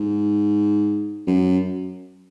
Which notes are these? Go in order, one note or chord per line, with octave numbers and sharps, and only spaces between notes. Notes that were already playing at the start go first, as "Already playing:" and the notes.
Already playing: G#2
F#2